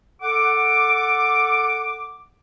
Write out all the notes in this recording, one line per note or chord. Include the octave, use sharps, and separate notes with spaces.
A4 F#5 D6